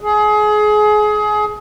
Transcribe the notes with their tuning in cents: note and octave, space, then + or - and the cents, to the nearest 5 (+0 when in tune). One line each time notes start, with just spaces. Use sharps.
G#4 +25